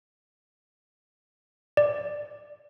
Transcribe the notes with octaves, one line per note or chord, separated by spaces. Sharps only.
D5